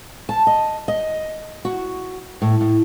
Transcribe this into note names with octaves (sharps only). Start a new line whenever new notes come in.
A5
D#5
D#5
F#4
A2
A2